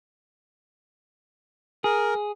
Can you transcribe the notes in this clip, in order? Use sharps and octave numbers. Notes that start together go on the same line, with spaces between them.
G#4 A#4